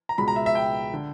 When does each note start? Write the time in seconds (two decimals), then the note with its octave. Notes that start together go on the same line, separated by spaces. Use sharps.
0.09 A#5
0.18 C#2 B2 G#3 B5
0.28 A#5
0.36 E5
0.46 E5
0.55 G5
0.94 D3